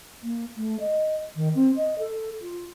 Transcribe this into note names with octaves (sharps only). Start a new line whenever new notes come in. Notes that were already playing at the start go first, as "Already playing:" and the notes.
A#3
A3
D#5
D#3
C4
D#5
A4
F4